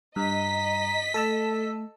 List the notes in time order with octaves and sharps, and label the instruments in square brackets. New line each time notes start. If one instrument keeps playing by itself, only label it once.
[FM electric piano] G2 [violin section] D#5 B6 [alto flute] A#5
[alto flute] A3 [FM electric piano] A4 A5 E6